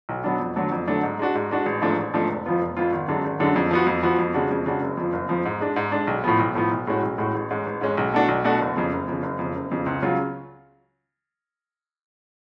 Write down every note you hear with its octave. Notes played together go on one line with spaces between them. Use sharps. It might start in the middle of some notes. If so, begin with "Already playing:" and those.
B1
B2 F#3 B3 D4
F2
D3 F#3 A3 D4
F2
D3 F#3 A3 D4
G#2
G#3 D4 F#4
G#2
G#3 D4 F#4
A1
G#2 F3 A3 D4
A1
G#2 F3 A3 D4
F1
F2 F3 B3 F4
F1
F2 F3 B3 F4
G#1
F#2 D3 G#3 D4
G#1
F#2 D3 G#3 D4
F2
F3 B3 F#4
F2
F3 B3 F#4
F2
C#3 G#3 D4 F#4
F2
C#3 G#3 D4 F#4
F#1
F2 F3
F#1
F2 F3
G#2
G#3 D4
G#2
G#3 D4
B1
A2 F3 B3
B1
A2 F3 B3
B1
A2 G#3 C#4 F#4
B1
A2 G#3 C#4 F#4
A1
G#2 G#3 C#4
A1
G#2 G#3 C#4
B1
B2 A3 D4 F#4
B1
B2 A3 D4 F#4
F#1
F2 C#3
F#1
F2 C#3
F#1
F2 C#3
F#1
F2 C#3
C#2
C#3 F#3 C#4 F4